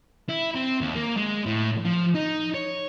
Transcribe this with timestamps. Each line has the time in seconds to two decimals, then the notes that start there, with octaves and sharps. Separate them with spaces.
0.29 E4
0.55 C4
0.81 D#2
0.96 A#3
1.17 G#3
1.46 A2
1.85 F3
2.15 D#4
2.54 C#5